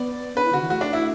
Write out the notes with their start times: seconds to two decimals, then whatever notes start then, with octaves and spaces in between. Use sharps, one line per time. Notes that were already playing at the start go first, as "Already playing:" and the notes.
Already playing: B3 D5
0.36 D4 B4
0.45 E4
0.53 D3 F#4
0.61 E3
0.70 A3 F#4
0.81 D4
0.93 E4